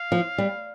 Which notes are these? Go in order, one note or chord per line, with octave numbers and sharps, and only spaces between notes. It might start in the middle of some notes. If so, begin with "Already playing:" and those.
Already playing: F5
F3
G3